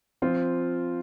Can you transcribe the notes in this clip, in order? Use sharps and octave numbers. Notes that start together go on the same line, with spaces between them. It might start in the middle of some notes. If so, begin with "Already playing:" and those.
F3 C4 F4